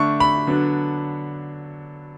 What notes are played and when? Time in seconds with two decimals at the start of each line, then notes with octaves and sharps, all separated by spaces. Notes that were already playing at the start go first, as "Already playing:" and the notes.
Already playing: D3 A3 D4 C#6
0.20 B5
0.47 D3 F#3 B3 D4